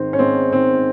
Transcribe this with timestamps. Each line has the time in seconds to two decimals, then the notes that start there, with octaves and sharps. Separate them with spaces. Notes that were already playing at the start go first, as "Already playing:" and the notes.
Already playing: G#2 D#3 C4
0.13 C#4
0.19 G#2 C4
0.52 D#3 C4